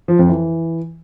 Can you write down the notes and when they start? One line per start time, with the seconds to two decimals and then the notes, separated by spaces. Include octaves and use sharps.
0.08 F3
0.19 F2
0.30 E3